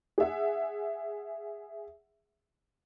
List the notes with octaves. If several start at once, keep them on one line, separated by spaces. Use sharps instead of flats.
G#4 E5 F#5